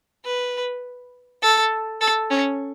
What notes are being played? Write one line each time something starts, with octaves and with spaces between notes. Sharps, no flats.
B4
A4
A4
C#4